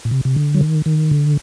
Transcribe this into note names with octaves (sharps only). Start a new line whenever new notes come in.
A#2
C3
C3
D3
F#3
D#3
D#3
D3